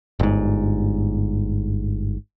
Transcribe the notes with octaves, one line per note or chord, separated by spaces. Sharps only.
G1 G#2